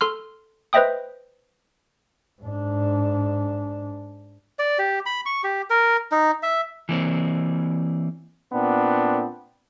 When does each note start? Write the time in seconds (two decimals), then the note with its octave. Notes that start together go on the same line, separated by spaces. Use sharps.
0.01 A4 C6 F6
0.73 B4 C5 D#5 E5 G5 D#6
2.42 G#2 D4
4.59 D5
4.79 G4
5.06 B5
5.26 C#6
5.43 G4
5.70 A#4
6.12 D#4
6.43 E5
6.89 E3 A#3 C4
8.53 A#2 B3 C4 D4